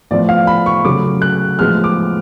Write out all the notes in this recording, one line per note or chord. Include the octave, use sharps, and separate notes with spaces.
A2 F3 B3 D5
F5
B5
C#6
C#3 F#3 A3 D6
F#6
A2 F3 G#3 B3 F6
D6